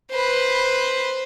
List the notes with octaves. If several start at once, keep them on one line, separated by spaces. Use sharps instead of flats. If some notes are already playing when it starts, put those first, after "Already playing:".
B4 C5